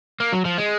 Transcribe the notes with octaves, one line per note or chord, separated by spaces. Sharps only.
A#3
F#3
F3
G#3